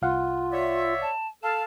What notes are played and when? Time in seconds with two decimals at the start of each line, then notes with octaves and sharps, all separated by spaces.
0.02 C2 F4 F5 F#5
0.52 C#5 D5 E5
1.02 A5
1.43 A4 F5 A5